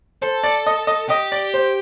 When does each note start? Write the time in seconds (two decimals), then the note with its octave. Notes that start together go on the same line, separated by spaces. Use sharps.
0.22 A4 C5
0.44 D5
0.66 D#5
0.87 D#5
1.09 G4 D#5
1.32 D5
1.54 C5